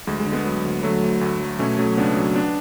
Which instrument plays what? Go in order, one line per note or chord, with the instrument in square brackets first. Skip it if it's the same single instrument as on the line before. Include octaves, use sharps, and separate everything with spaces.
[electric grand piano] D2 G#3
G#3
D3
G#3 B3
F#3
D2
D3 F#3 A3
D2
D2
F#3
B2 A3 C#4
F#3 A3 C#4
C#2 B3 D4
F#3
B3 D4